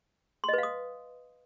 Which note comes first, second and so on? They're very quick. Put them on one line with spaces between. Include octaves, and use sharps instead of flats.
C6 D#5 B4 F5 D#6